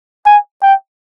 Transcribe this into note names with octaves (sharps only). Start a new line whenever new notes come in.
G#5
G5